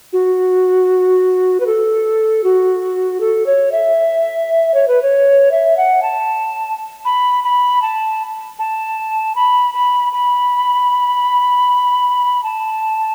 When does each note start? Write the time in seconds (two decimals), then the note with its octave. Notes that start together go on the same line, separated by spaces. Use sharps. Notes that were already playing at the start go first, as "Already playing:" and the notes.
0.13 F#4
1.60 B4
1.66 A4
2.44 F#4
3.21 A4
3.46 C#5
3.72 E5
4.74 C#5
4.88 B4
5.02 C#5
5.51 E5
5.77 F#5
6.02 A5
7.05 B5
7.44 B5
7.82 A5
8.59 A5
9.36 B5
9.74 B5
10.13 B5
12.43 A5